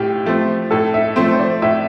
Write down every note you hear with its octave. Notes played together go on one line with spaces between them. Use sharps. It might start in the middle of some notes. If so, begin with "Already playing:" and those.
Already playing: A2 F4 G4
F3 A3 C4
A2 A4
E5
F3 A3 C4 C5
C5
D5
A2 E5